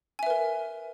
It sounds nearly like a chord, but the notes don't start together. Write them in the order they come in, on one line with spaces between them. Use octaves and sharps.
G#5 E5 B4 A#4